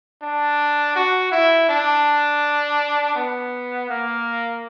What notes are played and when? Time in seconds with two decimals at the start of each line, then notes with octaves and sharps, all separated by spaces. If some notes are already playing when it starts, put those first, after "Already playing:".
0.22 D4
0.96 F#4
1.32 E4
1.69 D4
3.16 B3
3.90 A#3